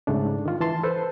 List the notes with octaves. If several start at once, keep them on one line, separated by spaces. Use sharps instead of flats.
G#2 C#3 A3 D4
D#3 F4
E3 A5 C6
A4 B4 C5